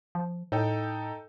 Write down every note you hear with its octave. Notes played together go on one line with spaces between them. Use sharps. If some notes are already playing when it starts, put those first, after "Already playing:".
F3
A2 D#4 A4 G5